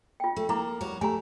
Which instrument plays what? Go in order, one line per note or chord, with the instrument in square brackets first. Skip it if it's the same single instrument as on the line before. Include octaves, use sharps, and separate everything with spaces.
[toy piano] F4 G5
[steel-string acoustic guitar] A3
[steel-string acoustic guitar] A#3 [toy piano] E4 A#5 D6
[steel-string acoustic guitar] G3 F#4 C#5
[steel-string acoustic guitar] A3 G4 [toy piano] G#5 A#5